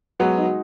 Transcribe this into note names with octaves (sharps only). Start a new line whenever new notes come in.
F#3 G#3 B3
D#4 F#4